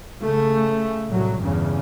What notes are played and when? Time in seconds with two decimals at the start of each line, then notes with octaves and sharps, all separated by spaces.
0.22 C#3 A3
1.09 C2 A2 F#3
1.40 E2 G2 C#3